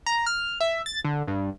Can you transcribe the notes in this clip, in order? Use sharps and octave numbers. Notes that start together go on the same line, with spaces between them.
A#5
F6
E5
A6
D3
G2